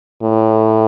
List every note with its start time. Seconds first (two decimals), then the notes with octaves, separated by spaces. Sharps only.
0.22 A2